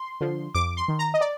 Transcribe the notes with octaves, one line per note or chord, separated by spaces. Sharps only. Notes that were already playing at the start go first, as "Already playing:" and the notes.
Already playing: C6
D3 F3
F2 D6
C6
D#3
A#5
D#5
D5